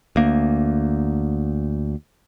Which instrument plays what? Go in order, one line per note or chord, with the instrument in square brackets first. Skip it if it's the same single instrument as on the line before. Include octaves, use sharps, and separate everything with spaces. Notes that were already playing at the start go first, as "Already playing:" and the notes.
[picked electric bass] D2 A#3